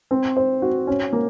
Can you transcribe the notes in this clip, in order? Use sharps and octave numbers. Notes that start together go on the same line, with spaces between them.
C4
C5
F#4
C#4
A#3